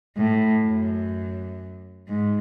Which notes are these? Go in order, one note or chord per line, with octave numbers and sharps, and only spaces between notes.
A2
F#2
G#2